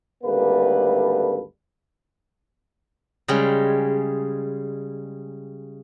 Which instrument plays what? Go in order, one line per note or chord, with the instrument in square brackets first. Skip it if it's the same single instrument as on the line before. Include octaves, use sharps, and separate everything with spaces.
[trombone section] G#1 D2 G3 A#3 A4 B4
[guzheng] C#3 G3 G#3